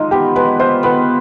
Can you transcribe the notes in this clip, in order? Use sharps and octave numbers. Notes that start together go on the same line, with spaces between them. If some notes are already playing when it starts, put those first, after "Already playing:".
Already playing: G#3 D#4 F4
B3 G4
G#3 B4
F4 C5
B3 B4